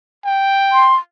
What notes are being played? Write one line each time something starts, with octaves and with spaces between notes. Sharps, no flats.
G5
C6